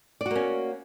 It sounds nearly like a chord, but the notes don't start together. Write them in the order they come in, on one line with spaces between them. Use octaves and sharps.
D5 F#4 A#3 C#4